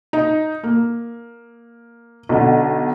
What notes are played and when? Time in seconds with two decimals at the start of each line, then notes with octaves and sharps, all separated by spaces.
0.13 D#4
0.63 A#3
2.29 B1 D3